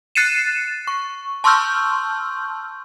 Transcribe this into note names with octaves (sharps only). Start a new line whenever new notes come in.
F#6 A6 C7 C#7 D#7 E7
C#6
A5 C6 C#6 E6 F6 G6